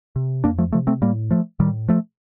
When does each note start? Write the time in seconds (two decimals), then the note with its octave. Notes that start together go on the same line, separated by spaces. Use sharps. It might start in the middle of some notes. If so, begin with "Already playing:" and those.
0.16 C3
0.44 F2 A#3 D4
0.58 F3 A3
0.72 C3 F3 A3
0.87 A3 C4
1.02 A2 G3 A#3
1.31 F3 A3
1.59 A2 D#3 G3
1.88 F3 A3